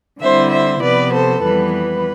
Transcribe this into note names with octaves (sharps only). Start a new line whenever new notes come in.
D3 G3 C4 E4 C5 E5
C5 E5
C3 F3 B3 B4 D5
A4 C5
F2 E3 G3 B3 B4
B4